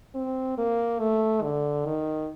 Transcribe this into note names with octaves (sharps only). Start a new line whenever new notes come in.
C4
A#3
A3
D3
D#3